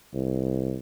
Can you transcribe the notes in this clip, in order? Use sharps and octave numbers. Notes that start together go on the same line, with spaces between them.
C2